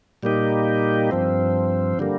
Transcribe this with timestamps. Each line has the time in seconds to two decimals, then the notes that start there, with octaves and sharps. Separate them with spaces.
0.23 A#2 G3 A#3 D#4 G4
1.11 G2 F3 C4
1.99 D3 G3 A#3